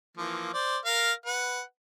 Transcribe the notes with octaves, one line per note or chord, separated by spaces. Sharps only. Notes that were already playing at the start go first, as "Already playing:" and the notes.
E3 F3 A#3
C5 D5
A#4 F5
B4 F#5